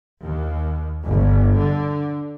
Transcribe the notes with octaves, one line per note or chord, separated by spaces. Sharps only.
D#2
G1
D3